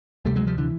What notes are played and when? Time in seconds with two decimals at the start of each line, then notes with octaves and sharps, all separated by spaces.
0.25 D2 C3 G3 A3
0.36 F#3 G#3
0.47 F3 G3
0.58 D3 E3